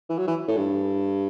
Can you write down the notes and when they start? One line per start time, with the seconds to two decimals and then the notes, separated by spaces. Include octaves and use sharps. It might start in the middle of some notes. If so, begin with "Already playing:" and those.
0.09 E3
0.18 F#3
0.28 E3
0.48 A2
0.57 G2